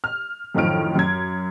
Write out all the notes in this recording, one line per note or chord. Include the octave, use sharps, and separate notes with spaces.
F6
F#2 A2 D#3 F3 F6 D7
F#2 G#6